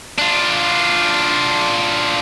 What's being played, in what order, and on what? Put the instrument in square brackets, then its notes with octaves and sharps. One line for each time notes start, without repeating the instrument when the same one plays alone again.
[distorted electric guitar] D4 F4